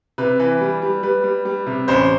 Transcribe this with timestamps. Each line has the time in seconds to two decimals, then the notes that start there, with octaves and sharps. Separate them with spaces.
0.18 C3 B4
0.39 E3 B4
0.61 G3
0.82 G3
1.03 G3 B4
1.24 G3
1.45 G3
1.67 C3
1.88 A1 C5